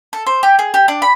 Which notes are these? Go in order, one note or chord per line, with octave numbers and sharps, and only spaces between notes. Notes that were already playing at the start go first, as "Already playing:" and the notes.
A4
C5
G4
G#4
G4
D4
B5